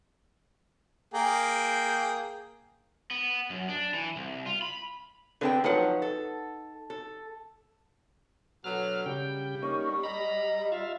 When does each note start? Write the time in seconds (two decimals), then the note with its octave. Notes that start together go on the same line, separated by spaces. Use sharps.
1.14 A#3 G#4 G5
3.11 B3
3.50 F#2
3.69 D4
3.94 E3
4.16 C2
4.46 F4
4.62 B5
5.41 D3 C4 D4 G#4 B4 G5
5.64 F3 F#3 D#4 B4 F#5
6.02 A4
6.90 A4
8.64 B2 D3 F#3 F6
9.06 C#3 G3 G5
9.63 A#3 C#4 D#4 C#6
10.04 D#5 A#5 B5
10.72 F4 E5 F5